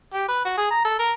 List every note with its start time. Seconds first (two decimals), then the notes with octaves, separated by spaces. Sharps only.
0.14 G4
0.28 B4
0.45 F#4
0.58 G#4
0.71 A#5
0.85 A4
0.99 A#4